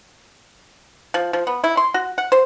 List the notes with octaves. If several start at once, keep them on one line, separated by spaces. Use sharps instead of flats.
F3
F3
B3
E4
C6
F#4
F#5
C5